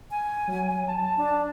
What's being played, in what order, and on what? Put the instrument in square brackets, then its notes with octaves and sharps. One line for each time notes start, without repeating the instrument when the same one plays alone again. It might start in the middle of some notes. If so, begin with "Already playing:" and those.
[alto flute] G#5
[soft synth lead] F#3
A5
[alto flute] D4